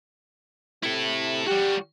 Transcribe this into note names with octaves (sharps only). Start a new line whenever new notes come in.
C3 E4 A4
G3 F#4 G4